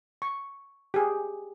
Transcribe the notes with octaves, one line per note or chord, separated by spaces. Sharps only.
C#6
G4 G#4